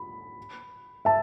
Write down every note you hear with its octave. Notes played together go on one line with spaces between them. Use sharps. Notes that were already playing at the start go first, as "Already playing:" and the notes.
Already playing: B5
E5 A5